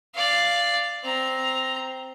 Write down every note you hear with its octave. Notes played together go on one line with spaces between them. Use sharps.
D5 F5
C4 A#5